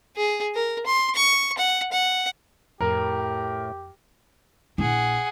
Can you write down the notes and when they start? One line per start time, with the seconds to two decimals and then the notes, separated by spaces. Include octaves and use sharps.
0.16 G#4
0.54 A#4
0.86 C6
1.15 C#6
1.58 F#5
1.92 F#5
2.81 F2 A2 G4 A#4
4.78 A#1 E4 G#4 F#5